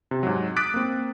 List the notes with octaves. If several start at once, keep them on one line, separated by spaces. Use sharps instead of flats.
C3
G#2 F#3
D6 D#6 F#6 A6 B6 D7
A#3 C4